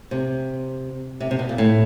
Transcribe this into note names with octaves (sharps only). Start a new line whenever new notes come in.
C3
C3
C3
B2
A#2
A2